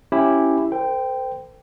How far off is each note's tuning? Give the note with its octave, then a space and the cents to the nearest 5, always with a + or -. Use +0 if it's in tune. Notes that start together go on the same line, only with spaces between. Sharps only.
C#4 -5 E4 +0 G4 +0
A4 +35 C5 -35 G5 +0